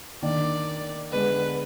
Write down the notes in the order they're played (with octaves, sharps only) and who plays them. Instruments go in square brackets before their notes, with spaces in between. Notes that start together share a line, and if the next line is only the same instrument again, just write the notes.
[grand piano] D#3 A#3 D4 [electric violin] D5
[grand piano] D3 G#3 B3 D4 [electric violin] B4